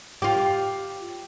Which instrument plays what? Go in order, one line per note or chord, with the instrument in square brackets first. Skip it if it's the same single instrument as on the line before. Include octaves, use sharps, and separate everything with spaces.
[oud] F4 G4